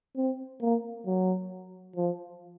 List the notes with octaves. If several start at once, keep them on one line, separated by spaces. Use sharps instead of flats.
C4
A#3
F#3
F3